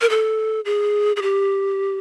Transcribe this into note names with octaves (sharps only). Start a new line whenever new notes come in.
A#4
A4
G#4
G#4
G4